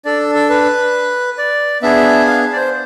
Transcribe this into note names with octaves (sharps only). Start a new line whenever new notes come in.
D4 A4 D5
A4
B4
D5
B3 D4 G#4 E5
F5
D5
C5